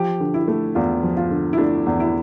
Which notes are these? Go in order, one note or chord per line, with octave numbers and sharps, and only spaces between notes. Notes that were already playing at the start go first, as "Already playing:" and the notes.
Already playing: F3 G4
D3
E4
A3
E2 F4
F3
F4
D3
E4
A3 D4
E2
E4